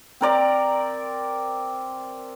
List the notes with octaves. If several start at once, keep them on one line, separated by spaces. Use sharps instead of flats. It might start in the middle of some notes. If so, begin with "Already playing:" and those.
C4 A#4 D5 A#5